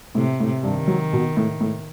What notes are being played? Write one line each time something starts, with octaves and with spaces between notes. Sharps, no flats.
A2 C3
A2
G2 D#3
F#3
B2
A2
A2